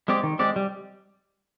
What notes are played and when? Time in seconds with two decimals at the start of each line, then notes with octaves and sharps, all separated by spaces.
0.08 G#3 C4 G4 D5
0.23 D#3
0.39 G#3 C4 G4 D5
0.56 G3